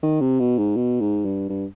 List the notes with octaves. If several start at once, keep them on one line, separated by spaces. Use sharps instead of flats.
D#3
C3
B2
G#2
B2
G#2
G2
G2